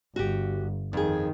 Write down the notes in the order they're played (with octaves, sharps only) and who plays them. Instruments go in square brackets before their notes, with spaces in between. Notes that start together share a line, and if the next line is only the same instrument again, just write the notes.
[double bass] G1 [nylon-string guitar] F#4 G4
[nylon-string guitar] F2 G#4 [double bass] D#3